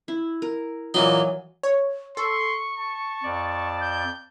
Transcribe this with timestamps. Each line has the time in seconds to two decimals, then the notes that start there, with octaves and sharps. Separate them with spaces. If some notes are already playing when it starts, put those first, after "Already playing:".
0.08 E4
0.42 A#4
0.94 A#2 E3 F#3 D#4 G#5
1.63 C#5
2.17 A4 C6 C#6
2.77 A5
3.24 F2 D5
3.81 G6